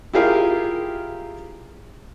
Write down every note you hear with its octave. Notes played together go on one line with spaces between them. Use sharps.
E4 F4 G4 G#4 A#4 F5